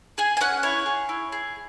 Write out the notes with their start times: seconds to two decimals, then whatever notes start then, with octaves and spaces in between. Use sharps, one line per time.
0.18 G#4 G#5
0.37 G#5
0.41 C#4 F#5
0.63 E4 C#5
0.86 G#4
1.09 E4
1.32 G#4